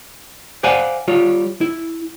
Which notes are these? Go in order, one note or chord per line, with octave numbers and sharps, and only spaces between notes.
C5 D5 F5 F#5 G#5
G3 F4 C#5
E4